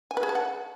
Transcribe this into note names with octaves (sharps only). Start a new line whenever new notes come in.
G#5
B4
G#4
A5
F#5